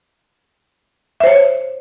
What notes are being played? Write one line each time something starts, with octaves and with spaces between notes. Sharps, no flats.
C5 C#5 E5